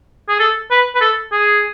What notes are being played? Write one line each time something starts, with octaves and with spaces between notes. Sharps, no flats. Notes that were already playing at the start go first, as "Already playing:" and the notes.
G#4
A4
B4
B4
A4
G#4